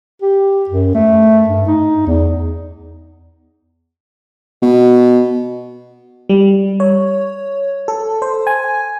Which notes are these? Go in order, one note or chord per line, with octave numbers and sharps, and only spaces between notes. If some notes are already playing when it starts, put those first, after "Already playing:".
G4
F#2
A3
G2
D#4
E2
B2
G3
C#5
A4
C5
G#5